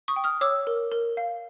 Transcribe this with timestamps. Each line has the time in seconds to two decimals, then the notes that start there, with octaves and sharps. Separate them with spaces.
0.08 C#6 D#6
0.16 G5
0.24 D#6 F6
0.41 C#5 D6 E6
0.67 A#4
0.92 A#4
1.17 F5